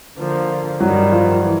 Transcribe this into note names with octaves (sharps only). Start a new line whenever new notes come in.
D3 F3 A#3
G2 D#3 F#3 G3 F#4
F3 F4
E3